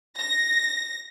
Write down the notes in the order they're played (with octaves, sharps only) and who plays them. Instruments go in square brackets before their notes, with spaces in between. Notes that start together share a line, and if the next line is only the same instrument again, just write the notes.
[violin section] A#6